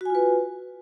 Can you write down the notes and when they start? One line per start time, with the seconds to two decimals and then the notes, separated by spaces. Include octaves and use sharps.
0.01 F#4
0.05 G#5
0.10 F4
0.15 B4